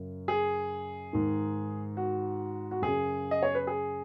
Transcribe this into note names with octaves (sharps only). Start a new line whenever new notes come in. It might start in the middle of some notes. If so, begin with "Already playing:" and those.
Already playing: F#2 C#3
G#4
G#2 D#3
F#4
F#4
F#2 C#3 G#4
D#5
C#5
B4
G#4